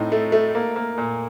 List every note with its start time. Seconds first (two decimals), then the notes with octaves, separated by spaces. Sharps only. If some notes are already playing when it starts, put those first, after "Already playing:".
Already playing: A2 C4 D#4
0.12 A3
0.32 A3
0.55 A#3
0.76 A#3
0.98 A#2